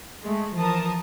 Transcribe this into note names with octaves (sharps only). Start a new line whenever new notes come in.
G#3 A3
E3 F3 A#4 A5 D#6